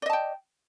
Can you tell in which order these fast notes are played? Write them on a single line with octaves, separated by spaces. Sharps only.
D5 D#5 A5 G5